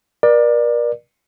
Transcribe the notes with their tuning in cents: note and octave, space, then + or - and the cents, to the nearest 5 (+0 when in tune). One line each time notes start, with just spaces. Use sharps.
A#4 +40 D5 +20